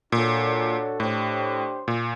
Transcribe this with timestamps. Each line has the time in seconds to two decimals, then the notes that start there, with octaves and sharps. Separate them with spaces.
0.12 A#2 D4 F#4 A4 C#5
1.00 A2 D4 G4 C5
1.88 A#2